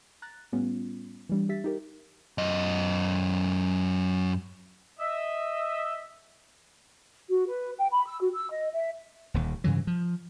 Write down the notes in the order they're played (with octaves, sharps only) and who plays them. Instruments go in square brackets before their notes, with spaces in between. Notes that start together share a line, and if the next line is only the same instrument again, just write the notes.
[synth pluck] A#5 F#6 A6
A2 G3 B3 C#4 F4
E3 G3 D4
G4 E5 A6 B6
D#4 G4 A#4
[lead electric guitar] F#2 D#5
[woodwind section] D#5 E5
[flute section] F#4
B4
G5
B5
E6
F#4
E6
D#5
E5
[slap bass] D#1 D#2
G2 C#3 E3 F#3
F3